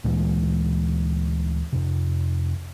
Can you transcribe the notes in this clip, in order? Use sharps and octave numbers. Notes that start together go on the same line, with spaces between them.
D2 A#2 E3 G#3
F2 C3